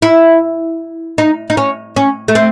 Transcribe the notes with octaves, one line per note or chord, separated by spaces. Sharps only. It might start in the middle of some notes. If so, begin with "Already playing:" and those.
E4
D#4
D#4
C#4
C#4
A3
C4